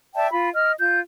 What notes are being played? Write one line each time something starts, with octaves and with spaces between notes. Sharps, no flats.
D5 E5 G5 A5
F4 B5
D#5 F6
F4 G6